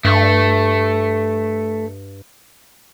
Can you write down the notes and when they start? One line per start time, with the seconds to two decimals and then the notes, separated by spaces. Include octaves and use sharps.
0.05 G2 A3